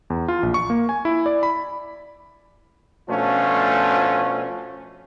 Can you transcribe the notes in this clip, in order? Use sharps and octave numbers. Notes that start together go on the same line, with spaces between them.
E2
F4
A#1
C#6
A#3
G#5
E4
D5
B5
B2 F3 A3 C#4 D4 F4